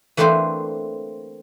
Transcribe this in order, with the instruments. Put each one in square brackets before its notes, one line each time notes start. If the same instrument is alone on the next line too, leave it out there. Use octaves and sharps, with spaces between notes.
[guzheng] E3 A3 A#3 C4 D4 C5